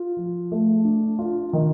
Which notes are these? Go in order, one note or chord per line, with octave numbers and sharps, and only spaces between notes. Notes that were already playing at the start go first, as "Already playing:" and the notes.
Already playing: F4
F3
A3
D4
F4
D#3